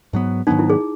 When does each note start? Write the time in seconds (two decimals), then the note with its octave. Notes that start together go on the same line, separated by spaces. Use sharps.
0.13 G#2 F#3 B3
0.47 G#2 D#3 F#3 B3 D#4
0.59 E4
0.70 G#4